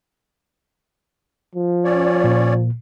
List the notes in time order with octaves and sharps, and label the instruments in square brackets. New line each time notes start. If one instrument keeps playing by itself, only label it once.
[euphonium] F3
[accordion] C#4 C#5 D5
[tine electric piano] A#2